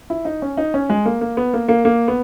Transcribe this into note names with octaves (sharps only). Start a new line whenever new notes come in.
E4
D#4
C#4
D#4
C#4
G#3
A#3
A#3
B3
A#3
A#3
A#3
B3